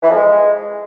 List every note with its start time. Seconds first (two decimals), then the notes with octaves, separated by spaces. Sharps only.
0.02 E3
0.09 F2
0.16 G#3